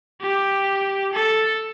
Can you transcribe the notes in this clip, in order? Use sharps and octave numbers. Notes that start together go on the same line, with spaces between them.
G4
A4